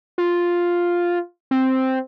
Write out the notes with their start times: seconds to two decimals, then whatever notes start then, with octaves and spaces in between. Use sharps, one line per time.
0.18 F4
1.51 C4